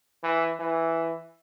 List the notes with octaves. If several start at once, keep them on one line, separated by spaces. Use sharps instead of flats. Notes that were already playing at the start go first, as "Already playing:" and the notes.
E3
E3